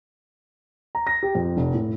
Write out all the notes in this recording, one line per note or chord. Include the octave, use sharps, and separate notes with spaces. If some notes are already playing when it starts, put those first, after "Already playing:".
A#5
A#6
G4
F2
F1
A2